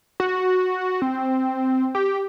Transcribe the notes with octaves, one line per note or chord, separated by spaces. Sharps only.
F#4
C4
G4